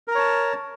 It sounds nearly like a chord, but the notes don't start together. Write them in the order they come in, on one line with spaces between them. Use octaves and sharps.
A#4 A#5 C#5 A5